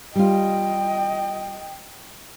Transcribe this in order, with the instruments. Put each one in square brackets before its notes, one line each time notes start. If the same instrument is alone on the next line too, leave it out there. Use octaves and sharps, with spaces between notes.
[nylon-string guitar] G3 F4 [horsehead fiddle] D#5 G5